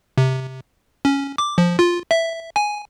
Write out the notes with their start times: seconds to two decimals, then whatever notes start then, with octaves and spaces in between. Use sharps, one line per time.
0.18 C3
1.05 C#4
1.38 D6
1.58 F3
1.79 F4
2.11 E5
2.56 G#5